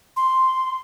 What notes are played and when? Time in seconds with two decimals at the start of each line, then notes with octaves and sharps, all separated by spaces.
0.17 C6